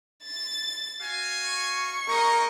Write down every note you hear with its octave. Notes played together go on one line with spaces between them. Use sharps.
A6
F#4 F5 G#5
C#6
A#3 D#4 A#4 D#5